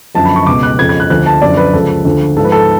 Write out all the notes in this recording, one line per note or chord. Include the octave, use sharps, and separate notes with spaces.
F#2 D3 F3 A5
B5
C#6
C#2 B2 D6
F#6
F2 C#3 F3 G#6
G#6
F#6
D2 D3 F3 F#6
A5
F#2 D3 F3 D5
B4
C#2 C#3 F3 A4
D2 D3 F3
G#2 F3 A4
B4
A4